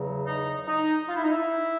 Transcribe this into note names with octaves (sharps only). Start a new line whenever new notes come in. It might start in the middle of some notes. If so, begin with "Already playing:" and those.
Already playing: E2 C#3 F#3
D#4
D#4
F4
E4
D#4
E4